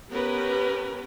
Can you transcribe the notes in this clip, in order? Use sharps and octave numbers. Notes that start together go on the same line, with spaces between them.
B3 C#4 G4 A#4 B4